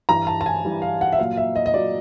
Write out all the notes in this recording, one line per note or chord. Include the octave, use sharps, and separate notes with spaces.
G2 E3 G3 A#5
A5
A5
G#5
G2 E3 G3
F5
F#5
E5
A#2 F#3 F5
E5
D#5
D#5
A#2 F#3 D5